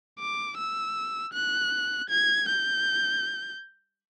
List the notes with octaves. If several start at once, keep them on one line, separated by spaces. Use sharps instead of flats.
D6
E6
F#6
G#6
G6